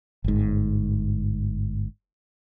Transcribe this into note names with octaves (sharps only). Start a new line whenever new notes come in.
G1 G#2